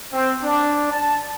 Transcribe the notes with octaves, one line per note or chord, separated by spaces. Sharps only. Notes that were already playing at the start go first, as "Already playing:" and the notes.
C4
D4
A5